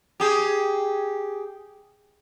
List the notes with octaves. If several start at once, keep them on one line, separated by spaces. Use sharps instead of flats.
G4 G#4